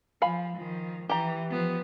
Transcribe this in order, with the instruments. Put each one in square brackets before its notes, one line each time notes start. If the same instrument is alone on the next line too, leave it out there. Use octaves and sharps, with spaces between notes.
[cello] F3 [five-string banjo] F5 G#5 B5
[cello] D#3 F3
[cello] E3 [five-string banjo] G4 A#5
[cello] F3 B3